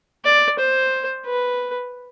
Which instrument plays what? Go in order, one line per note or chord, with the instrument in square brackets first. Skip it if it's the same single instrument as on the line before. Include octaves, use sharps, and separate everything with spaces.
[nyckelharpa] D5
C5
B4